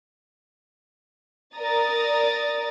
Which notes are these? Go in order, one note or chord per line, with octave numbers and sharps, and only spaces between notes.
A#4 D5 A#5 D#6 A6